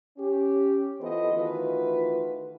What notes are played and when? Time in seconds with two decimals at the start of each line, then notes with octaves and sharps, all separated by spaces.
0.17 C#4 G4
1.00 E3 B3 F4 A4 C5 D#5
1.32 D#3 E3 A3 F4 F#4 B4